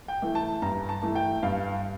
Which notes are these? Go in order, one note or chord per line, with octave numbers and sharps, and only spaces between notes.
G5
E3 A3
A5
G2 A#5
A5
E3 A3
G5
G2 F5